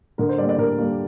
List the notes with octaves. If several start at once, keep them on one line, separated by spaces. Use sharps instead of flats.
D3 A#4
C5
G3 A#3 D5
D5
D3 A#4
G3 A#3